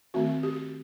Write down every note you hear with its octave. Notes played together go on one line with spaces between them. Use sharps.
D#3 A3 C4 F#4
G4